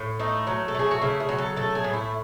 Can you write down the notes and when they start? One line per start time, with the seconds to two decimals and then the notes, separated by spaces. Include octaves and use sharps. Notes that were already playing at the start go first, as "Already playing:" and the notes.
Already playing: A2
0.19 A3 D#4
0.47 F#3 D#4
0.68 A4
0.75 A3 G#4
0.91 F#4
1.01 C#3 E4
1.20 G#4
1.29 F#3
1.38 A4
1.56 A3 A4
1.75 G#4
1.84 A2
1.93 E4